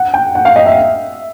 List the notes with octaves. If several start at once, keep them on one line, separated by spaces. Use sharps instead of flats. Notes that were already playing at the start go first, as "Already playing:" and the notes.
Already playing: F#5
G5
F#5
F5
D#5
E5